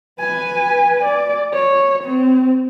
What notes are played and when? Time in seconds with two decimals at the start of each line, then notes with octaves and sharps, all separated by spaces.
0.20 B4 G#5
1.04 D5
1.54 C#5
2.04 C4